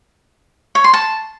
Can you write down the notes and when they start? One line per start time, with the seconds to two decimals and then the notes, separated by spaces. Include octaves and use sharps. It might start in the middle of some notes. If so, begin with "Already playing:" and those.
0.75 C#5
0.84 C6
0.93 A5